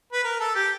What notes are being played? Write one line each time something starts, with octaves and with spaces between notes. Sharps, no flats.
B4
A#4
A4
G4